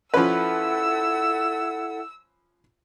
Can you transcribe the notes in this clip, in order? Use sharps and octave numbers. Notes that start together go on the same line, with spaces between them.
F3 C#4 E4 A4 B4 F#5 E6